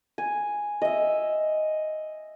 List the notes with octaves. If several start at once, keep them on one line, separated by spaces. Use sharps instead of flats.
G#5
D#5 E5